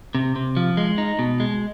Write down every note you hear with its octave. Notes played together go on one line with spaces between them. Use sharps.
C3
C3
F3
G#3
D#4
B2
G#3